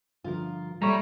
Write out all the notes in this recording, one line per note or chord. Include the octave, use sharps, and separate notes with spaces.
G2 D3 F3 F4 A#4
A#2 G3 A3 C#5 A#5